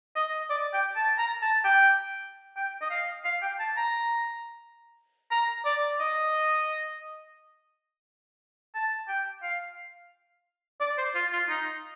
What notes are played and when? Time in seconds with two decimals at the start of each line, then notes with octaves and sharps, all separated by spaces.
0.16 D#5
0.50 D5
0.74 G5
0.96 A5
1.18 A#5
1.42 A5
1.65 G5
2.57 G5
2.82 D#5
2.91 F5
3.25 F5
3.42 G5
3.60 A5
3.77 A#5
5.31 A#5
5.65 D5
6.00 D#5
8.75 A5
9.09 G5
9.43 F5
10.81 D5
10.98 C5
11.15 F4
11.33 F4
11.49 D#4